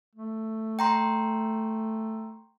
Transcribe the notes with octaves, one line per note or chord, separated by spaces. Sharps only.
A3
G5 A#5 C6